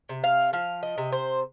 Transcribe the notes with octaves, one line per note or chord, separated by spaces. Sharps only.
C3
F5
F3 F5
D#5
C3
C5